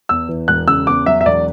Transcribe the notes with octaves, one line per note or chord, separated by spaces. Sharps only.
E2 E6
E3
E1 F#6
C#3 E6
E2 D6
F#3 E5
E5
E1 D5